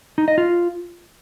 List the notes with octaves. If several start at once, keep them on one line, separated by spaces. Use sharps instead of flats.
D#4
D#5
F4